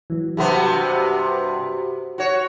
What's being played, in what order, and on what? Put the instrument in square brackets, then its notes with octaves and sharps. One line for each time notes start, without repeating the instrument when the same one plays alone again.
[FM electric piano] E3 F#3
[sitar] G2 C3 B3 [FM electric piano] F#4 G4 C5
[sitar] F#4 C#5